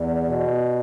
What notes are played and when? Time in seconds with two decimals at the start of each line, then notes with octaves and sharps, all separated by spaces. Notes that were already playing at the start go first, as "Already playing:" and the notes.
Already playing: E2 G3
0.27 B2